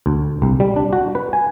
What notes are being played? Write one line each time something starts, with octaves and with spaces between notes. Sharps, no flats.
D2
C2
G3
D4
F#4
B4
G#5